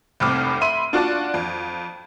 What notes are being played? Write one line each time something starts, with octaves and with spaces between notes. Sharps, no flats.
F1 C2 A2 C4 D6 F6
E5 B5 C6 D#7
D4 F4 F#4 D5 A5
F2